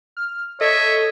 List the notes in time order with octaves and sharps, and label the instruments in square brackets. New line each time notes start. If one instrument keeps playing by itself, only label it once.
[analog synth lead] F6
[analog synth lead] A4 [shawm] C#5 [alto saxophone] D#5 [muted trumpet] E5